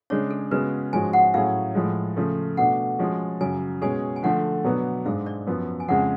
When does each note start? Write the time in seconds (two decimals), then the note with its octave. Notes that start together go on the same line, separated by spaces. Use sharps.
0.10 C#3 G#3 D4 C#5
0.30 A4
0.51 C#3 G#3 B3 F#4 B4
0.93 G#2 F3 G#3 C#4 F#4 G#5
1.13 F#5
1.34 A2 F#3 C#4 G#4 F5
1.75 A2 F3 G#3
2.16 C#3 F3 A3
2.57 B2 A3 D4 F#5
2.99 F3 G#3 C#4 F#4
3.41 F#2 C#3 F#3 G#5
3.82 B2 G#3 C#4 G#4 G#5
4.16 G#5
4.23 D3 F3 A3 F#5
4.64 B2 F#3 B3 D4
5.05 G#2 G#3 D4 F5
5.26 D5
5.47 F#2 F3 B3
5.80 G#5
5.88 F2 C#3 G#3 F#5